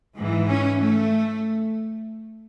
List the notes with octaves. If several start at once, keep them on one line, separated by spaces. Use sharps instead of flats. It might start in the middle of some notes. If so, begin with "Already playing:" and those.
G#2 E3
C#4
A3